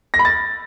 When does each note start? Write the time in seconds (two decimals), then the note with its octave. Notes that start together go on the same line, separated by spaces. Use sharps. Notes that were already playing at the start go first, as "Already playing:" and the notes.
0.14 A#6
0.19 B5
0.25 A6